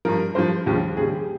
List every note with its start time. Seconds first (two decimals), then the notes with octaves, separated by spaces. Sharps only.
0.05 G2 F3 A#4
0.35 G2 F3 C5
0.66 D#2 C#3 F3
0.97 D#2 C#3 G3 G#4
1.12 G4